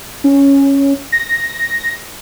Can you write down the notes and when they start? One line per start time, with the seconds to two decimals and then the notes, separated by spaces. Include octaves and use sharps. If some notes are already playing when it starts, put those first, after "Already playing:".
0.24 C#4
1.12 A#6